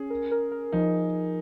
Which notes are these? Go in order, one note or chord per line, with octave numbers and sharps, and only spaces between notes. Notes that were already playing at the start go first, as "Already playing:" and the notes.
Already playing: C#4 G#4
A#4
A#4
A#4
F3 D#4